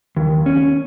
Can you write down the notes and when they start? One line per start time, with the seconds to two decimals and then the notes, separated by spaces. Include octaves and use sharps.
0.17 D#2
0.46 C#4